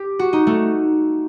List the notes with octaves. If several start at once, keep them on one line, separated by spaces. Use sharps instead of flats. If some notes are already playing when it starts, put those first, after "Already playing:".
Already playing: G4
F#4
D#4
A3